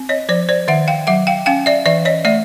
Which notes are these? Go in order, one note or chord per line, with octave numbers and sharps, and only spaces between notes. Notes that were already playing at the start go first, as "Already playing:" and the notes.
Already playing: C4
C#5 D#5
F3 C5 D5
C5 D5
D#3 E5 F#5
F5 G5
F#3 E5 F#5
F5 G5
C#4 F5 G5
D5 E5
E3 D5 E5
C#5 D#5
A3 D5 E5